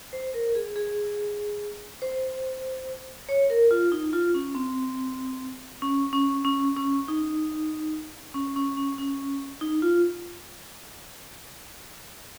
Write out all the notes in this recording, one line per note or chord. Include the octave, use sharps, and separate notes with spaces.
C5
A#4
G#4
G#4
C5
C#5
A#4
F4
D#4
F4
C#4
C4
C#4
C#4
C#4
C#4
D#4
C#4
C#4
C#4
C#4
D#4
F4